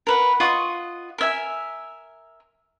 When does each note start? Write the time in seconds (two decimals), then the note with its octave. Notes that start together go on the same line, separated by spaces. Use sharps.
0.07 A#4 B4 F#5
0.40 F4 D#5 F#5 C#6
1.18 A#4 E5 G#5